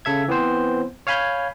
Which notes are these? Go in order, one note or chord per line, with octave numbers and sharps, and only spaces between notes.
C#3 A4 E5 G#6
E3 B3 C4 C5
C#5 F5 G#5 B5 G6